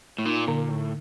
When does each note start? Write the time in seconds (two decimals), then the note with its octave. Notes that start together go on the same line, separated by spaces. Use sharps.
0.18 A2
0.25 A#2 D#4
0.47 A#2 D3
0.69 A2 D3